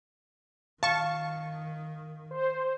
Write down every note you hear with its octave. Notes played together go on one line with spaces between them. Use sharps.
D#3 F5 A5 C#6
C5